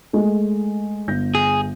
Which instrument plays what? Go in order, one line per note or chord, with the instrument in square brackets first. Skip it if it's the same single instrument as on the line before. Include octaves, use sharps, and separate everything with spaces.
[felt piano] G#3 A3
G1 G6 A#6
[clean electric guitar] G#4